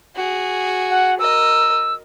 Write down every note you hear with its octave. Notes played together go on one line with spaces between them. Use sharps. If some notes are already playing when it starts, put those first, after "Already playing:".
F#4 G#4
F#5
A#4 D#5 E6